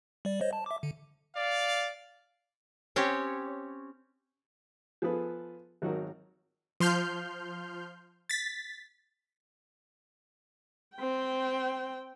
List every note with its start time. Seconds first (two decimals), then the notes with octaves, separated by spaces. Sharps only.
0.25 G3 D5
0.41 C5 C#5 D#5
0.53 A5
0.66 E5 D6
0.83 D3
1.36 D5 F5
2.96 C4 C#4 G4 C#5
5.02 F3 B3 G#4 A4 B4
5.82 G#1 F#3 D#4 F#4 A#4
6.80 F3 C6 F6 G6
8.29 A6 B6
10.95 C4 G5